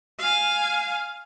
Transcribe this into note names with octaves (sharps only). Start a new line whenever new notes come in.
F5 G#5